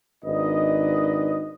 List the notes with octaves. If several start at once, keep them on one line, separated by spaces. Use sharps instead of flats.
G#1 D4 D#4 B4 D5 D#5